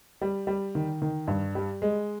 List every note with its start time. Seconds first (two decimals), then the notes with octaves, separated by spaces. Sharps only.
0.21 G3
0.47 G3
0.75 D#3
1.02 D#3
1.27 G2
1.55 G3
1.82 G#3